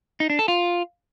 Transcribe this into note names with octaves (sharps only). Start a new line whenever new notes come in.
D#4
D4
A4
F4